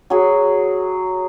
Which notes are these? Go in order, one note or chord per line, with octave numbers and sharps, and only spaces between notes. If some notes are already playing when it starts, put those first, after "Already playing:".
F#3 G#4